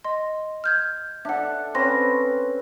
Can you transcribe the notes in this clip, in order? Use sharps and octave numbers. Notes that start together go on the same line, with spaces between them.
D#5 C6
F6 G6 G#6
D4 A4 E5 F#5
C4 C#4 B4 C6 A#6